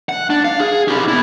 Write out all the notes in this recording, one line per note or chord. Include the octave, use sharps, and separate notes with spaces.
F#5
D4
F5
G#4
E4 G4
B3 E4